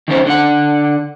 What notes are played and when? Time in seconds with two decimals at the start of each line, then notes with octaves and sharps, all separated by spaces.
0.08 D#3 F3 A3 C4 C#4 C5
0.26 D3 F#5